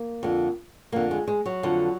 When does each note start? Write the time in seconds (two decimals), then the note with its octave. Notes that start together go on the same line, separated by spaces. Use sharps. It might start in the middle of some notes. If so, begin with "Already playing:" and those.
Already playing: A#3
0.23 F2 D3
0.92 F2 D3 A#3
1.11 G#3
1.27 G#3
1.46 F#3
1.63 F2 D3